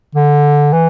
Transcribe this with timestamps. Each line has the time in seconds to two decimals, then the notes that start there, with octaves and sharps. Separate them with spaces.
0.15 D3
0.73 E3